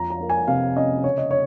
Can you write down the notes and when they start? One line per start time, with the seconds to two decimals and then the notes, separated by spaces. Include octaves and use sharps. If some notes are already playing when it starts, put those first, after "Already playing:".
Already playing: F2 F3 A#5
0.10 A#5
0.20 A#3
0.30 G#5
0.47 C3 F5
0.76 C#4 D#5
1.04 C#3 C#5
1.18 D#5
1.31 C#5